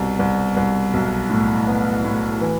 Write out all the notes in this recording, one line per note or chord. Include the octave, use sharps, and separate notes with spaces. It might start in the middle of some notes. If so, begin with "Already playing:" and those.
Already playing: C2 B2
C2
C2
B1
A2
B3
A2
E3